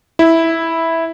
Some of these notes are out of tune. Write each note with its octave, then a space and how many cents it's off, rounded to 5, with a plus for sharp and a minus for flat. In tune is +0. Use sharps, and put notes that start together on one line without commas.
E4 -5